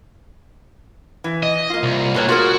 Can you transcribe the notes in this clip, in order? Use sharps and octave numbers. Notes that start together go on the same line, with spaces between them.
E3
D#5
A#3 F4
C2
A2 A#3 A4 B4 C#5
F4 F#4 G#4 A#4